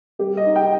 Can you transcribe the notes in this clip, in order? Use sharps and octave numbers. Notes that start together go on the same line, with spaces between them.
G3 G4
D#5
D#4
G5